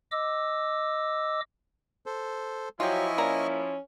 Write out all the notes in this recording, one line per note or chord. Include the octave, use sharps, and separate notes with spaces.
D#5 D6 E6
A4 C5
F3 F#3 E4 F4 G4 D#5 G#5 C#6
A#3 C#4 D5 A#5